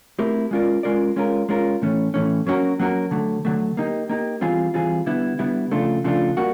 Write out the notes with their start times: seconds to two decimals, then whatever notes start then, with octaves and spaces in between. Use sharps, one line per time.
0.19 A3 C4 E4 G4 A#4
0.51 G#3 C#4 F4 A#4 D5
0.83 G#3 C#4 F4 A#4 D5
1.16 G#3 C#4 F4 A#4
1.49 G#3 C#4 F4 A#4
1.82 A2 E3 A3 C#4
2.14 A2 E3 A3 C#4
2.47 F#3 A#3 C#4 F#4 A#4
2.80 F#3 A#3 C#4 F#4 A#4
3.11 D3 F#3 A3
3.45 D3 F#3 A3
3.77 A#3 D#4 G4
4.10 A#3 D#4 G4
4.41 E3 G3 C4 F4 G#4
4.74 E3 G3 C4 F4 G#4
5.06 D3 G3 B3 E4
5.39 D3 G3 B3 E4
5.72 C#3 F3 A3 D4 F4
6.04 C#3 F3 A3 D4 F4
6.37 G3 A#3 F#4